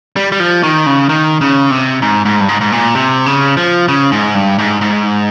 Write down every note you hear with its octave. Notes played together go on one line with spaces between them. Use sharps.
G3
G3
F3
D#3
C#3
D#3
C#3
C3
G#2
G#2
G2
G#2
G#2
A#2
C3
C#3
F3
C#3
G#2
G2
G#2
G#2